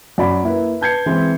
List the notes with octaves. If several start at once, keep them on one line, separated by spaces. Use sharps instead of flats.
F#2 F#3 D5 F#5 B5
A#3 E4 B4
B4 A5 G6 G#6 C7 C#7
E3 G#3 C4